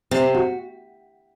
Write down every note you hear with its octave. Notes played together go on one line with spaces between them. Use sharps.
C3 C4
F#4